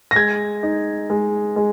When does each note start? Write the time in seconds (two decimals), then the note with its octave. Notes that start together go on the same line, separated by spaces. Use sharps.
0.11 A#6
0.15 G#3 G#6
0.63 D#4
1.10 G#3
1.56 G#3